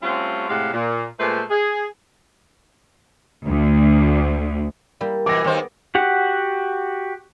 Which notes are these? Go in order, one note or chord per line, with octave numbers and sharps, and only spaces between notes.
G3 A3 C4 C#4 F4 F#4
A2 C3 G#3 G4 F5 F#5
A#2
A#2 G#3 A3 B4 C5
G#4
D2
G3 A#3 E4
B2 E3 D6 A#6
D#2 D#3 B3 G#4 C5 G#5
F#4 G4 F#5